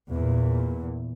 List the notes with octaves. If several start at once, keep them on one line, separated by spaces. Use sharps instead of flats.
E2 A#2